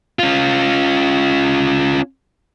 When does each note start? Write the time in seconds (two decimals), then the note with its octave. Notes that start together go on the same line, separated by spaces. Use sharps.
0.19 C#4 F4